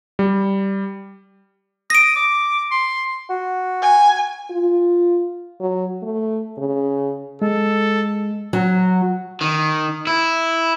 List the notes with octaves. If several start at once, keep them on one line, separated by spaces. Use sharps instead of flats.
G3
D#6 A#6 D7
D6
C6
F#4
G#5
F4
F#3
A3
C#3
G#3 A4
F#3
D#3
E4